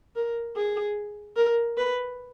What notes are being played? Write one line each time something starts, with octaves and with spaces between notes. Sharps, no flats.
A#4
G#4
A#4
B4